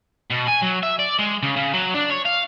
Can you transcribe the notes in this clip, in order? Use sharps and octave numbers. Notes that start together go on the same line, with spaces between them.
B2
G#5
F#3
E5
D5
G#3
C#3
C#3
F#3
D4
C#5
F5